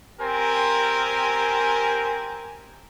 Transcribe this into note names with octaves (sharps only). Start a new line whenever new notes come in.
C4 G4 A#4 G#5